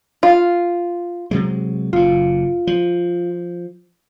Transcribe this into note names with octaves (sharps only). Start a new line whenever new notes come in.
F4
C3 F#3 G#3
F#1 A#2 F4
F3